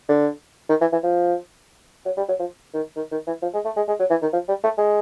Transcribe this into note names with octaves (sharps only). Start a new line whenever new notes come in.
D3
D#3
E3
E3
F3
F#3
G3
F#3
F3
D#3
D#3
D#3
E3
F3
G#3
A3
G#3
G#3
F#3
E3
D#3
F3
G3
A3
G#3